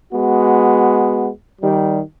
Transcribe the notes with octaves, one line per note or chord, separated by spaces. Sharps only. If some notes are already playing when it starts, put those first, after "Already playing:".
G#3 B3 F#4
D#3 G3